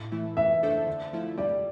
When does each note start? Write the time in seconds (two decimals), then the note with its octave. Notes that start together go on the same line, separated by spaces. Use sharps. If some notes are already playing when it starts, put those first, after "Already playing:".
Already playing: A2
0.12 E3 A3 E4
0.37 E3 E5
0.63 A3 D4 A4 C5
0.87 D3
1.13 F3 A3 E4
1.37 G3 D5